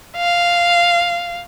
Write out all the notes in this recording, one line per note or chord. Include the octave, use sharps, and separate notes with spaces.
F5